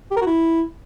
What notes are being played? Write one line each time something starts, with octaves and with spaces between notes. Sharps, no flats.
G4
A#4
F#4
E4